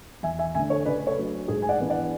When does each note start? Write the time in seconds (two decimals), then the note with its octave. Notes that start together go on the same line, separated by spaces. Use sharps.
0.23 E2 E5 G#5
0.39 E5 G#5
0.55 D3 A3 D4 E5 G#5
0.70 A4 C#5
0.86 C#3 B4 D5
1.07 A4 C#5
1.18 F#3 A3 D4
1.48 G#2 G#4
1.62 G#5
1.69 D5 F#5
1.80 E3 B3 D4
1.90 D5 F#5